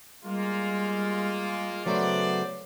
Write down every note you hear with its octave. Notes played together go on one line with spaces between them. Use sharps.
G3 G#3 A#3 F4
C#3 F#3 A3 B3 C5 D5